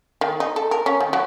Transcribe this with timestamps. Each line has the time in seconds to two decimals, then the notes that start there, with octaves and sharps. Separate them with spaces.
0.21 D#3
0.40 D#4
0.56 A4
0.71 A#4
0.86 C#4
1.00 D#3
1.13 F#3